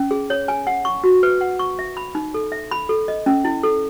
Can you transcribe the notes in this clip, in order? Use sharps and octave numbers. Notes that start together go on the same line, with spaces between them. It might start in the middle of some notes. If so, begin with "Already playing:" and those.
Already playing: C#4
G#4
C#5
G#5
F#5
C#6
F#4
B4
F#5
C#6
E5
B5
D#4
A4
E5
B5
A4
D#5
C#4
E4
A4